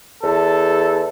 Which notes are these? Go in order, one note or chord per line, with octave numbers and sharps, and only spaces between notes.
E2 A4